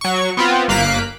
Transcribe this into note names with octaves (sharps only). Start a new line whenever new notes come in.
F#3 C#6
B3 C4 F4
G1 A#3 F5 F#6 B6 D7